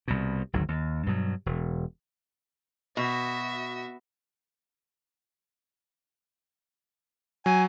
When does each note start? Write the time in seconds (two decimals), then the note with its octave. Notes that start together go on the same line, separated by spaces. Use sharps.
0.08 C2 B2
0.53 G#1 D2 D#3 F#3
0.68 D#2
1.06 G2 B2 F#3
1.46 E1
2.97 B2 F#4 E5
7.46 F#3 G#5